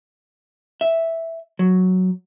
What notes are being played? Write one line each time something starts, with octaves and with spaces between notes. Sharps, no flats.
E5
F#3